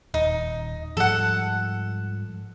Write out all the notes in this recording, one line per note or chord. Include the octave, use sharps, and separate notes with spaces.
D#1 D#4
G#2 F3 G3 A4 F#5